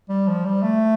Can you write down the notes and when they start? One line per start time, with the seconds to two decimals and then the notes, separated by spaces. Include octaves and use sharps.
0.09 G3
0.28 F3
0.45 G3
0.63 A3